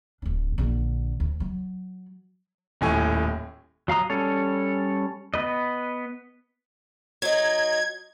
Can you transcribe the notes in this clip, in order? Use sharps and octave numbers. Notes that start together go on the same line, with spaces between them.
D1 D4
A#1 D3
D2
F#3
D#1 A2 G#5 C#6
F#3 F5 A#5 D#6
G3 C#4 A4 C#5
B3 B4 D#5
F#3 D#4 G#6